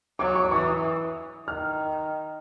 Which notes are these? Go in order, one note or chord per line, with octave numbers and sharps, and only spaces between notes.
F#3 D6
C#6
D6
E3 C#6
D#6
D#3 F6